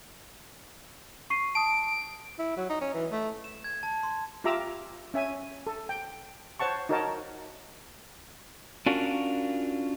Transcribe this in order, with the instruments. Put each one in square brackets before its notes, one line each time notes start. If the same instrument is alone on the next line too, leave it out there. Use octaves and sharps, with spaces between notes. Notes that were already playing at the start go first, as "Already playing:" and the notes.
[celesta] C#6 C7 D#7
[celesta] A5 D#6 [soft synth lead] D7
[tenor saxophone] E4
F#3
D#4
C#4
E3
A3
[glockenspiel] E7
G#6
A5
C6
[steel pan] F4 G4 E5 A#5 D6 E6
C#4 E5 G#5
A4
G5
C5 C#5 F#5 A5 C#6
D#4 F#4 A#4 C#5 D#5 A5
[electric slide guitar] C#4 D4 F4 F#4 A#4